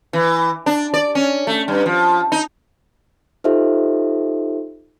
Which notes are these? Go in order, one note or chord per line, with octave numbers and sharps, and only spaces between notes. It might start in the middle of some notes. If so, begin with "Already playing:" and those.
E3
D4
D5
C#4
A3
G2
F3
D#4
D#4 F4 G4 A4 C5 E5